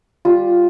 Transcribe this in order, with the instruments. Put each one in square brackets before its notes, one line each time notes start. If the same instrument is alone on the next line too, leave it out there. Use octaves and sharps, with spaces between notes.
[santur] G3 F4